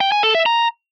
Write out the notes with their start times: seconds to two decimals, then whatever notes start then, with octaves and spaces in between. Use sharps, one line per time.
0.01 G5
0.12 G#5
0.23 A4
0.35 E5
0.46 A#5